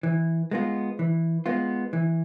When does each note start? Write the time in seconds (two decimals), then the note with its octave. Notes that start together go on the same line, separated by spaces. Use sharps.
0.03 E3
0.51 G#3 B3 F4
0.99 E3
1.46 G#3 B3 F4
1.93 E3